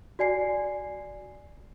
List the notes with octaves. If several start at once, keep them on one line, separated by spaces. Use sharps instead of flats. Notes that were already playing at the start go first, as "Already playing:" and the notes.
F#4 D5 G#5 C7